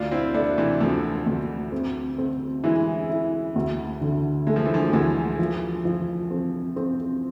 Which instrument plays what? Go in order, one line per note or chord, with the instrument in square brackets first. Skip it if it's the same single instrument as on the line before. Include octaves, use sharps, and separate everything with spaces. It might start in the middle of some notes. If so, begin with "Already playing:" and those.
Already playing: [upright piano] D2 [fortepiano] D4 F4
[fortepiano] C4 E4
[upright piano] A3 [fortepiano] B3 D4
[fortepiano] C3 E3
[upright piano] D2 [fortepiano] D3 F3
[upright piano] D2
C4
C4
[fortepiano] E3 G#3 [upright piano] E4
[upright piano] E4
D2
D3
[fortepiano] G#3 [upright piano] A3
[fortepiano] F3
E3
D3 F3
[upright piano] D2 [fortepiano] E3 G#3
[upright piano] F3
F3
C4
C4